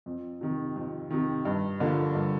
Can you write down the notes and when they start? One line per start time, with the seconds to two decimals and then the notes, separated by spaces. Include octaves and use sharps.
0.06 F2
0.41 C3 D#3
0.76 F2
1.10 C3 D#3
1.45 G2
1.80 D3 F3 A#3
2.15 G2